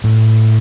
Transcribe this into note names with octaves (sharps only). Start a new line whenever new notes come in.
A2